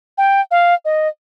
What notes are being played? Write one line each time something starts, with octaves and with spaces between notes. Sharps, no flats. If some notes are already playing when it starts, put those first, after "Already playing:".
G5
F5
D#5